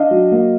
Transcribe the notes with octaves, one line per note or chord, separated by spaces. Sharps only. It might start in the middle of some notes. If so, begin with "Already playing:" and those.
Already playing: D4 D#5 F5
F#3
A#3